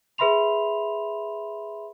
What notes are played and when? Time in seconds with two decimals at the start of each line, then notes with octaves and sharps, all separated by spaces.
0.18 G#4 B4 E5 B5 C6 F7